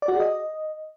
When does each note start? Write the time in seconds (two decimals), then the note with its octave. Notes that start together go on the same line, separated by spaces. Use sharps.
0.02 D5
0.08 F#4
0.14 G#4
0.20 D#5